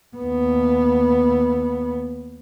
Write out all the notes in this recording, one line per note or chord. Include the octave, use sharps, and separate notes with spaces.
D#2 B3